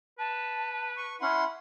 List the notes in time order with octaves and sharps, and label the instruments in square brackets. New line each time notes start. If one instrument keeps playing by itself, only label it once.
[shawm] B4 [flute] A5
[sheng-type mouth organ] C#6
[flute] C#4 [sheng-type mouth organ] E4 F#5 C6